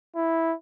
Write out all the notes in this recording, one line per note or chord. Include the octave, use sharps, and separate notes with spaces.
E4